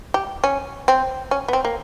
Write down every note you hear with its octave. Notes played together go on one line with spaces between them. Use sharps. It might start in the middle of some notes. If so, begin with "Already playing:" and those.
G4
C#4
C4
C#4
B3
C4
A#3